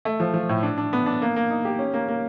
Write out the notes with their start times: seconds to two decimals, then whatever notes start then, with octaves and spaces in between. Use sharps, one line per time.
0.05 A3
0.20 F3
0.34 F3
0.49 A2
0.63 D4
0.78 D4
0.93 B3
1.06 D4
1.22 A#3
1.36 A#3
1.50 D#4
1.65 G4
1.79 C#4
1.94 A#3
2.08 A#3